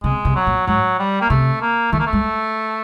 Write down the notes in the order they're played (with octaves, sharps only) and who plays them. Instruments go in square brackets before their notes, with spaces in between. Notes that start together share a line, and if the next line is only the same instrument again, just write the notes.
[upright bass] C3 [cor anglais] G#3
[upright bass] C3
[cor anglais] F#3
[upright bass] A#2
[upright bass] G#2 [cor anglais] F#3
[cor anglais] G3
A#3
[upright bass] C3 [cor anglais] A3
[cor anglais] A#3
[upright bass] D#3 [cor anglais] A3
[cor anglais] A#3
A3
[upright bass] G#3